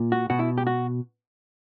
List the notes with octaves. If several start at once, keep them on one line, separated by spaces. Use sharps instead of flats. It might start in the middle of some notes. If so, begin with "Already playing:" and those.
Already playing: A#2
F#4
B2 F#4
E4
G4
F#4